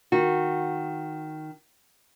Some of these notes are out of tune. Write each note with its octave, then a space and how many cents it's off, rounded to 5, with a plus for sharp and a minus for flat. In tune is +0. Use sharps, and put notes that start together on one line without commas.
D#3 +0 F#4 -20